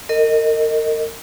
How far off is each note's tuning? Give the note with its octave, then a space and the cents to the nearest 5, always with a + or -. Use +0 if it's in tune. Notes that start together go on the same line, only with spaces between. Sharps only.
A#4 -35 D#5 +0